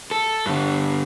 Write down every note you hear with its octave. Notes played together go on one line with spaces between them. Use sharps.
A4
G2 D3